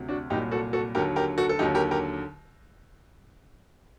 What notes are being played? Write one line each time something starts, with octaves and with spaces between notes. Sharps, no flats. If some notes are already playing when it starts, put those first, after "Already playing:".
Already playing: D2 C3 F#3
D4 F#4
C2 A#2 F#3 D#4 G4
F#4 A4
F#4 A4
D#2 D3 F#3 G4 A#4
G4 A#4
F#4 A4
A4
D#2 D3 F#3 D#4 G4
G4 A#4
G4 A#4